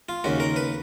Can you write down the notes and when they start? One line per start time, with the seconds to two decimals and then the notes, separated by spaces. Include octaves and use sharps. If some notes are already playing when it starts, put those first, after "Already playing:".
0.09 F4
0.24 D#2 C#3 F#4
0.40 A#4
0.56 B4